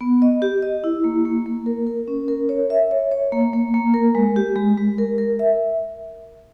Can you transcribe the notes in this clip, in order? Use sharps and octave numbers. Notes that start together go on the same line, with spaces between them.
B3
D#5
G4
D#5
E4
A#3
A#3
A#3
A#4
A#4
C#4
A#4
C#5
E5
C#5
C#5
A#3
A#3
A#3
A#4
G#3
G4
G#3
G#3
A#4
A#4
E5